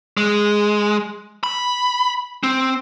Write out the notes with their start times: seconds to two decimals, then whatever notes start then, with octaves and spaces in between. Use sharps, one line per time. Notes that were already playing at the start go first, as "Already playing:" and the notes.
0.17 G#3
1.43 B5
2.43 C4